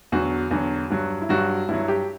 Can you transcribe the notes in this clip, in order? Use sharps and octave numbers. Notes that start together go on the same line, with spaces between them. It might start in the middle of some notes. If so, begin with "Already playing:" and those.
E2 D3 F#3 F#4
E2 D3 F#3
G2 F#3
E4
G2 F#3 F#4
G2 F#3 E4
G4